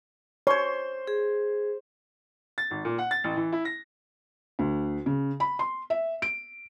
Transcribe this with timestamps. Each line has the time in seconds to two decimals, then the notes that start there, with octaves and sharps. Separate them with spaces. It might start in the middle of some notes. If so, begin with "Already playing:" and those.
0.47 C5 C#5 C6
1.07 G#4
2.58 A6
2.71 G#1
2.85 A#2
2.98 F#5
3.11 A6
3.24 A1
3.36 E3
3.52 E4
3.65 A#6
4.59 D2
5.06 C#3
5.40 B5
5.59 C6
5.90 E5
6.22 D7